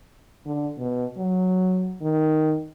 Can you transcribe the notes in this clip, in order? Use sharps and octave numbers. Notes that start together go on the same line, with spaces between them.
D3
B2
F#3
D#3